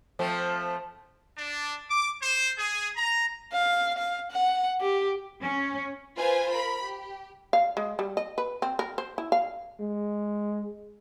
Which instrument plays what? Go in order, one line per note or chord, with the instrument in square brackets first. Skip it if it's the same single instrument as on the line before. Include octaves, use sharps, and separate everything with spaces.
[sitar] F3 A3 C4
[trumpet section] D4
D6
C5
G#4
A#5
[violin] F5
F5
F#5
G4
[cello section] C#4
[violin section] F4 B4 C5 G#5
A#4 B5
G4
[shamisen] F5
G#3
G3
D#5
B4
C4
A#4
C5
E4
F5
[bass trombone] G#3